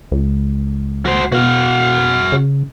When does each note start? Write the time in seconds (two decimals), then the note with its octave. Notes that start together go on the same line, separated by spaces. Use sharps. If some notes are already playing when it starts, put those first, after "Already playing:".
0.11 C#2
1.06 F#4 C5
1.32 B2 F#4 F5
2.32 C#3